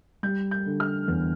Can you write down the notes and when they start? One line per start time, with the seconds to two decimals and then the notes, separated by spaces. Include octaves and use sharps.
0.23 G3 G6
0.51 G6
0.66 D3
0.80 F6
1.08 E2